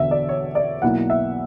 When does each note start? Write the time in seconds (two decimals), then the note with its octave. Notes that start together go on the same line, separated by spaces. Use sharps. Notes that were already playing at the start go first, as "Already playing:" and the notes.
Already playing: E1 E2 D3 E5
0.11 D5
0.29 C#5
0.55 D5
0.82 B1 B2 A#3 E4 F#5
1.10 E5